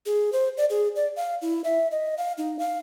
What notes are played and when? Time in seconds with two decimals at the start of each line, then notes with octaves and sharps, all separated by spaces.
0.06 G#4
0.33 C5
0.57 D5
0.70 G#4
0.96 D5
1.16 F5
1.42 E4
1.64 E5
1.91 D#5
2.18 F5
2.38 D#4
2.59 F5